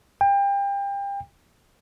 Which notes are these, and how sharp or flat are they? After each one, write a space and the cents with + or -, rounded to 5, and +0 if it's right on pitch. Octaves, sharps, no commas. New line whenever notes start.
G5 +30